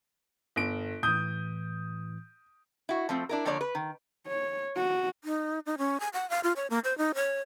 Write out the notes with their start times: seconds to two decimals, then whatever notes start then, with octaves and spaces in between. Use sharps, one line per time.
0.56 G1 D7
1.03 A2 E3 D#6 G6
2.89 E4 F#4
3.09 F3 A3 C4
3.29 D4 E4 A#4
3.45 D3 F3 A#3 C#5 D5
3.61 B4
3.75 D#3
4.27 C#5
4.77 F#4
5.24 D#4
5.66 D#4
5.78 C#4
6.00 G#5
6.13 F#5
6.30 F5
6.44 F4
6.56 C#5
6.70 A#3
6.84 C5
6.98 D#4
7.15 C#5